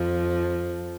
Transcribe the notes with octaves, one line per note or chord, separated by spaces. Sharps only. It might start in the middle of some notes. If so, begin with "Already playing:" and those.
Already playing: F2 F3